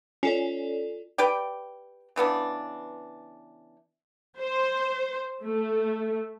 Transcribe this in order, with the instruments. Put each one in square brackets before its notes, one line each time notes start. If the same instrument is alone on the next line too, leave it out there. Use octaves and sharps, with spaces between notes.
[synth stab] C#4 [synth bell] F4 A4 D5
[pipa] G4 B4 D5 G5
C#3 E3 B3 D4
[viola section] C5
A3